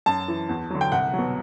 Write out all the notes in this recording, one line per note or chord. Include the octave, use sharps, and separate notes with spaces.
F#2 A5
E3
E2
D3 F#3
G5
C2 F#5
F#3
B2